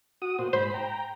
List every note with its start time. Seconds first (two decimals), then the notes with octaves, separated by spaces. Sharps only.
0.22 F#4 D#6
0.39 A#2 F#4 C5
0.53 G#2 C5 B5
0.74 G5 A#5